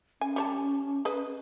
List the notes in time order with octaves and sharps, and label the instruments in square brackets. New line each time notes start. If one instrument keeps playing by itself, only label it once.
[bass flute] C#4 [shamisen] G#5
[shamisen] G3 C#5 A5
G#4 B4 D#5